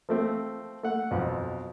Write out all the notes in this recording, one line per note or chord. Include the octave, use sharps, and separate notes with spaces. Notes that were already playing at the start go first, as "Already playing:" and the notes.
F3 A3 C4
A3 F#5
B1 F2